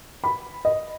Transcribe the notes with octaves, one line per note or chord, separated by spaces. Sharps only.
B5
D#5